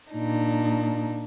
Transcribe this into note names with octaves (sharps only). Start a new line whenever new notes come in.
A#2 D4 D#4